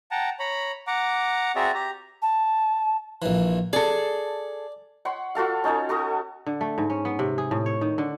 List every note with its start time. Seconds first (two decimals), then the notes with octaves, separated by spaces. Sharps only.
0.11 F#5 G5 A5 A#5
0.39 C#5 A#5 B5
0.87 F#5 A#5 D6
1.56 C4 F#4 G#4 D5 E5 A#5
1.74 G4 A#5
2.22 A5
3.22 A#1 E3
3.73 G#4 A4 D5
5.05 C#5 F#5 B5 C6
5.35 F4 F#4 A4 F5
5.64 C#4 D#4 A4 C#5
5.89 F#4 A4 C#6 D#6
6.47 D3
6.61 A3
6.78 G#2
6.90 C#4
7.05 B3
7.19 C3
7.38 G#4
7.51 A2
7.66 C#5
7.81 D#3
7.98 D3